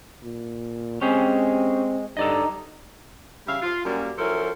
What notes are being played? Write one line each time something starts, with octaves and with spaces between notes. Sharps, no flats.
A#2
G#3 C4 C#4 G4 G#4
G2 D#4 A4 D5 D#5
C#3 G3 E5 F5
F4
F#2 G3 A#3
F3 F#3 C#4 E4 A4 A#4